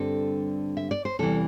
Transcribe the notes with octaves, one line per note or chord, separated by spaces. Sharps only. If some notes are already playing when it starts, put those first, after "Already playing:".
Already playing: G2 D3 G3 C4 A4
E5
D5
C5
E2 C3 E3 G3 A4